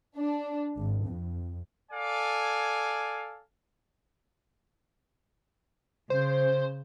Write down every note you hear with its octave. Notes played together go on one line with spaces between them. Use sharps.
D4
G#1
F2
A4 D5 F5 G#5
C#3 C5